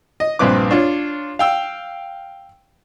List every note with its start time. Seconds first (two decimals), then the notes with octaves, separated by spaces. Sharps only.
0.20 D#5
0.39 A#1 G2 C4 B4 D6
0.71 D4 F4 C#5
1.39 F5 G5 E6